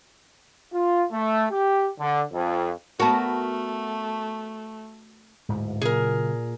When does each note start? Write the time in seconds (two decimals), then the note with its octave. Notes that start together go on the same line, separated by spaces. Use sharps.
0.73 F4
1.11 A3
1.51 G4
2.00 D3
2.33 F2
3.00 A3 B3 F#4 A#4 A5
5.49 D1 G#2
5.82 A#2 C#3 F#3 G#4 A#4